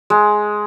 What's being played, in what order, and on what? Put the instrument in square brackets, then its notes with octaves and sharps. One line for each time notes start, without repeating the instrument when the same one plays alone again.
[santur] G#3